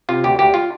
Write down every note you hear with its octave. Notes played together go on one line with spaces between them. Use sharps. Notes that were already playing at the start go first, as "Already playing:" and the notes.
C3 F4
D2 G4
D2 G4
F4